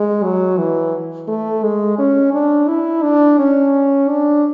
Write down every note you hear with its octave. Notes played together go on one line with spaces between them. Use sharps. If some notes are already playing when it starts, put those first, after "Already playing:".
Already playing: G#3
F#3
E3
A3
G#3
C#4
D4
E4
D4
C#4
D4